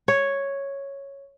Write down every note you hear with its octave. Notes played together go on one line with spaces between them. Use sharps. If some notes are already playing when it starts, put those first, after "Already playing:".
C#5